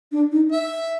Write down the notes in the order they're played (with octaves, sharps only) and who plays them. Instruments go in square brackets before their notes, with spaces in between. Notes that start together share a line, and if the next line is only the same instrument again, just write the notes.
[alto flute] D4
D#4
[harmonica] E5